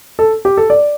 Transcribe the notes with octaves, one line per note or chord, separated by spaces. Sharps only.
A4
G4
A4
D5